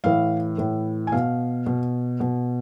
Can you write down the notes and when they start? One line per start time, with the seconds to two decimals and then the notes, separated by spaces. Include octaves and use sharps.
0.04 A2 E3 F5
0.58 A2 E3
1.07 G#5
1.12 B2 F5
1.66 B2
2.20 B2